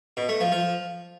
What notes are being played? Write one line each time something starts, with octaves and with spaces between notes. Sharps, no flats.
B2
A3
F3
F3